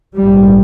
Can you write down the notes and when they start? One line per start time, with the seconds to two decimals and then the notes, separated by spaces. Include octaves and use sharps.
0.16 A#1 G#2 G3